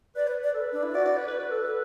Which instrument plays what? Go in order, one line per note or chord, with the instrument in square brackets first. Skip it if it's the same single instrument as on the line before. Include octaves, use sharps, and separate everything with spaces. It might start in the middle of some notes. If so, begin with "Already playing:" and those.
[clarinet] B4 [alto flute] D5
[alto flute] B4
D5
[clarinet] A4
B4
[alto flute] D4
E4
[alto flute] F#4 [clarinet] D5
[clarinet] D5
B4
B4
B4
A4
[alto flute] A4 [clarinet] B4